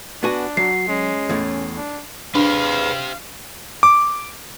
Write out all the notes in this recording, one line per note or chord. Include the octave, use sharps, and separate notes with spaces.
B3 D4 F#4 G#5
F#3 F#4 C7
G#3 C#4
E2 A2
D4
D4 G4 G#4 B4 C5 F5
D6